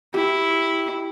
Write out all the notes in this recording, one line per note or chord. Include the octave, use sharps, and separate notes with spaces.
E4 G4